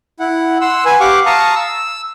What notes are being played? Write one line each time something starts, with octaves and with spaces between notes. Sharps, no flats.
E4 F#5
F#5 C6 E6
B4 G#5
G4 F5 F#5 C#6 D6
F5 A5 A#5 C#6 D#6
E6